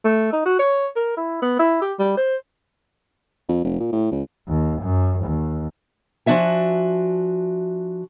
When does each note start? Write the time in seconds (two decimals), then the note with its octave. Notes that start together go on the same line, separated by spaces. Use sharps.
0.04 A3
0.32 D#4
0.45 F#4
0.59 C#5
0.96 A#4
1.17 E4
1.42 B3
1.59 E4
1.82 G4
1.99 G3
2.17 C5
3.49 F2
3.64 F1
3.80 A#2
3.92 A2
4.12 C#2
4.48 D#2
4.81 F#2
5.24 D#2
6.26 F3 D4 F#4 E5 G#5